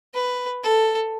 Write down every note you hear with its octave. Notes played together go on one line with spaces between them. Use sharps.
B4
A4